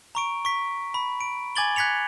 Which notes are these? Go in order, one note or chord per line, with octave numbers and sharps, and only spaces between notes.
A#5 C#6 D7
C#6 B6
B5
D7
G#5 D6 G#6 A6 F#7 G7
F#6 G#6 B6 C#7 F7